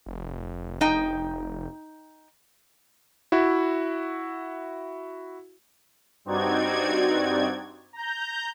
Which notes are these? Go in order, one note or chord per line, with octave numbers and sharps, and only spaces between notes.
F1
D#4 G5
E4 F#4 E5
G2 C4 D#4 F#4 D5 G#6
A#5 G6